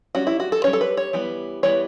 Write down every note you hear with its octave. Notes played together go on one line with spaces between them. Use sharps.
G3 C#4 F#4
E4
F#4
A4
G3 C#4 C#5
A4
B4
C#5
E3 G3 B3
E3 G3 B3 C#5